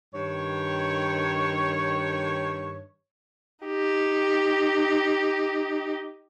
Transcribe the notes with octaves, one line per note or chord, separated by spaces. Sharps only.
G2 D#3 C#5
D#4 G4